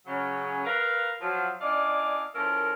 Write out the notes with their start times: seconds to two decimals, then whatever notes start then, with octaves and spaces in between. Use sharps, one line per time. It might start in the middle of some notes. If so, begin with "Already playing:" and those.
0.06 C#3 F#3 C#4
0.64 A#4 B4 F5
1.21 F3 F#3 F4
1.61 C#4 D4 E4 D5 D#5 F5
2.35 F3 C#4 E4 A4 A#4